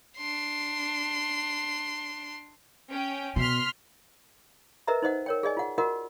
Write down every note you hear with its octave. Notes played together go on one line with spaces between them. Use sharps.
D4 C6
C#4 G5
B2 C6 F6 B6
A#4 B4 D#5 E5 A#5
D#4 C5 D#5 F#5
A#4 C#5 G5
G#4 D5 D#5 G#5
F4 F#5
F4 F#4 A#4 D#5 F#5